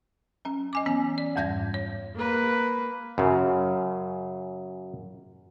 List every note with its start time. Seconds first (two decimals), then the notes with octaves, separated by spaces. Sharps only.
0.45 F#3 C#4
0.73 D#5 G#5 D6
0.86 E3 B3 C#4
1.18 D5
1.36 F2 G#2 G3 G6 G#6 A#6
1.74 C#5
2.16 A#3 B4
3.18 F#2 C#3